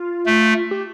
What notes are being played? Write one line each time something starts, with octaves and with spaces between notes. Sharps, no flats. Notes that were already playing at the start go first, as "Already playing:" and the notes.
Already playing: F4
A3
G4